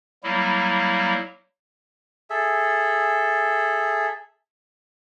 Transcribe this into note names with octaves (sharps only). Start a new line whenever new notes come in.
F#3 G3 A#3 E4
G#4 A4 E5